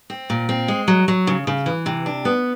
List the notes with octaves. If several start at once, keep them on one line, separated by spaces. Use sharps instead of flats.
C4
A#2
C4
G#3
F#3
F#3
C#3
C#3
E3
C3
D4
B3